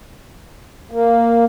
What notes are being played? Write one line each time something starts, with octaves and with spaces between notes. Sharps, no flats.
A#3